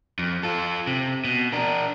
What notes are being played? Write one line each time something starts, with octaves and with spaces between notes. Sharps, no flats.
F2
F4 A4
C3
B2
D4 A#4